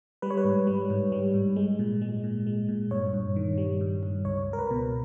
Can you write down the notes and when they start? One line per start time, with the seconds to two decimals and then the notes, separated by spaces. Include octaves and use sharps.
0.22 G3 B4
0.31 C#5
0.37 B4
0.45 G#2
0.67 G3
0.90 G#2
1.12 G3
1.34 G#2
1.56 G#3
1.79 A#2
2.02 G#3
2.24 A#2
2.47 G#3
2.69 A#2
2.91 G2 C#5
3.14 G2
3.36 D#3
3.58 G3
3.81 G2
4.03 G2
4.25 C#2 C#5
4.48 C#2
4.53 A#4
4.59 B4
4.71 B2